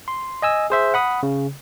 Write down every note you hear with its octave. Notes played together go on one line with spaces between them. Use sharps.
C6
D#5 G#5 E6
G#4 C5 E5
F#5 B5 D#6
C#3